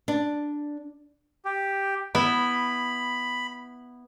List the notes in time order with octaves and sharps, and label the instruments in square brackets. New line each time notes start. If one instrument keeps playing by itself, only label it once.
[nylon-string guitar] D4
[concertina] G4
[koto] B3 E4 [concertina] B5